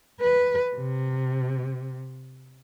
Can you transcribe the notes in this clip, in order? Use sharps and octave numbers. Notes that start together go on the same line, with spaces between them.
B4
C3